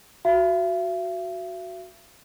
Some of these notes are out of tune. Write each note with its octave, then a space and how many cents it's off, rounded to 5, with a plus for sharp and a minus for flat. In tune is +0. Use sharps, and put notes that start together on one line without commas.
F#4 +0 E5 +45